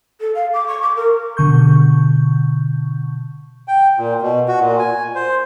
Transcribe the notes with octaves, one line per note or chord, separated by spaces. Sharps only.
A4
F5
D6
C#6
D6
A#4
B2 D3 C#6 G6
G5
A#2
B2
F#4
A#2
G#5
C5